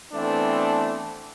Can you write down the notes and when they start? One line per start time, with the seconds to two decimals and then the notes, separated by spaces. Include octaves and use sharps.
0.13 E3 A3 B3 C4 D4